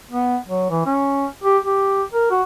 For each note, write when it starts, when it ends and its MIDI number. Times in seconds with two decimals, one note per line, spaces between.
0.10 0.38 59
0.47 0.66 54
0.70 0.83 52
0.86 1.26 61
1.44 1.58 67
1.64 2.03 67
2.13 2.28 70
2.30 2.43 66